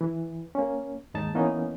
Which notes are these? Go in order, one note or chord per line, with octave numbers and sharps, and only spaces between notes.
E3
A#3 C#4
D#2 G#2 D#4 A5
E3 A#3 B3 C#4 D#4